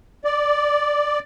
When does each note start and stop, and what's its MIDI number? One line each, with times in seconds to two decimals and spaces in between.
0.25 1.19 74